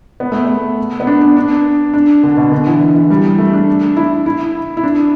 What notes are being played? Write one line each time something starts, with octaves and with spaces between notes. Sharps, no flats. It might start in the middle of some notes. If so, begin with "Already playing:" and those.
B3
A3
B3
B3
D4
D4
D4
D4
D3
B2
D3
E3
E3
E3
G3
A3
D4
E4
E4
E4
D4